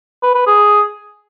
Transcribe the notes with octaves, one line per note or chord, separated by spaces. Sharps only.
B4
B4
G#4